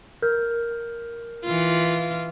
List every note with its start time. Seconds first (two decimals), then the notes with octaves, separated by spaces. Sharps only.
0.22 A#4 F6 G6
1.44 E3 F4